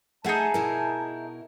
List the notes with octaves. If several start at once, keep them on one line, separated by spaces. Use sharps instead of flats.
A3 D#4 G#4 E5 F#5 G#5 A5
B2 E4 A#4